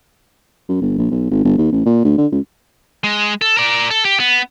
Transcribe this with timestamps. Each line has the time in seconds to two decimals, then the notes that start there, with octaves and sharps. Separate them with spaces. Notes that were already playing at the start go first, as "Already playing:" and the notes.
0.69 F#2
0.81 G1
0.98 A#1
1.11 B1
1.31 G#1
1.44 G1
1.58 D#2
1.72 A1
1.86 A#2
2.05 D2
2.18 D3
2.32 C#2
3.04 G#3
3.41 A4
3.57 A#4 D5
3.91 A4
4.05 G4
4.20 B3